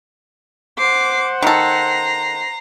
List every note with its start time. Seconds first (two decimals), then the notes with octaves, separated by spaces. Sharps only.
0.78 C5 F#5 D6 C7
1.42 D#3 A4 A#5 C7